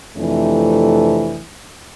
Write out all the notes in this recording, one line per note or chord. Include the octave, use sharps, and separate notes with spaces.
F2 C3 E3 A3 D4